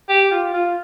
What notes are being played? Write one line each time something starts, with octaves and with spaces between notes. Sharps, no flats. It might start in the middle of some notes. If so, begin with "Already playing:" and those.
G4
F4
F4